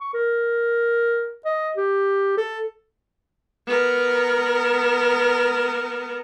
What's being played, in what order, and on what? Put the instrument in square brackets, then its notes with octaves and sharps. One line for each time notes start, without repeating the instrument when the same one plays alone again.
[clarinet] C#6
A#4
D#5
G4
A4
[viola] B3 A#4